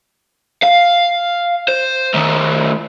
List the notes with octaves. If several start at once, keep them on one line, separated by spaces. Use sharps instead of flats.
F5
C5
D#3 A3